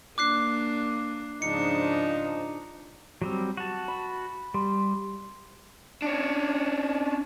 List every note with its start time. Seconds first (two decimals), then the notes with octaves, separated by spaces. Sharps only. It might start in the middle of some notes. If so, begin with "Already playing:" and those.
0.18 A#3 D4 D6 F#6 C7
1.42 G#2 C#3 F3 D4 D#4 C#7
3.22 F#3 G3 C4
3.57 F#4 A5
3.88 B5
4.54 G3 C6
6.02 C#4 D4